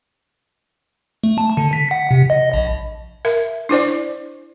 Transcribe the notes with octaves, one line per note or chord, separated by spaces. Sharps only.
A3
A5
D3
B6
F#5
C3
D#5
A#1
A#4 E5
D4 E4 C5 D5